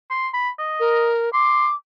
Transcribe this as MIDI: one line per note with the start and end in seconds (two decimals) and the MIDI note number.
0.10 0.28 84
0.33 0.49 83
0.58 1.09 75
0.80 1.32 70
1.33 1.67 84
1.33 1.75 86